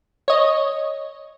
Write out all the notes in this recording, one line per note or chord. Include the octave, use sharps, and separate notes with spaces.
C#5 D#5